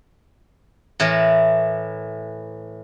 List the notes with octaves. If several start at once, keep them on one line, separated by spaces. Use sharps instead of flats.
A2 E3 A#4